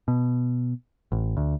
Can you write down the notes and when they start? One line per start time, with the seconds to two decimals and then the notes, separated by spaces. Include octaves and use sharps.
0.08 B2
1.12 A1
1.37 D2